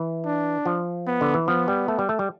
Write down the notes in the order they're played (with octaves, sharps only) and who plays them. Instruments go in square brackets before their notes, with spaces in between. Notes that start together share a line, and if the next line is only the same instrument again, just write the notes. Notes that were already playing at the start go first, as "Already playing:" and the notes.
Already playing: [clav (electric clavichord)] E3
[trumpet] D4
[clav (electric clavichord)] F3
[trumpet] B3
[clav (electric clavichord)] D3
E3
[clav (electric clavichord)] F3 [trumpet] B3
[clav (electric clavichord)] G3
A3
G3
A3
G3